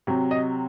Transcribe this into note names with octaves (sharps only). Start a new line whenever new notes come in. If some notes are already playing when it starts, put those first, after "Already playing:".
C3 F#3
D#5